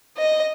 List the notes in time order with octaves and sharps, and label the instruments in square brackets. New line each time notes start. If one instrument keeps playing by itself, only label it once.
[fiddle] D#5